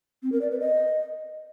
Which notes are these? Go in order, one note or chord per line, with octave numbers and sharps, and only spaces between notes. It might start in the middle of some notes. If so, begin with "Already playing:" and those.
C4
A#4
D5
B4
D#5